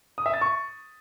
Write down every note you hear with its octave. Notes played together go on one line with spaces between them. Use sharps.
D#6
E5
A6
C#6